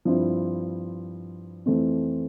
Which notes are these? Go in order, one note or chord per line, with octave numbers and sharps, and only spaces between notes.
G2 F3 C4 E4
F2 E3 A3 C4